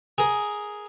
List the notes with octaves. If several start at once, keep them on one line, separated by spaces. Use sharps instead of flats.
G#4 A#4